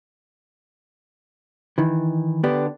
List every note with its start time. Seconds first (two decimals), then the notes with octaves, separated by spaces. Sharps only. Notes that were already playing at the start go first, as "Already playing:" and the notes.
1.78 D#3 E3
2.44 D3 B3 D4 G4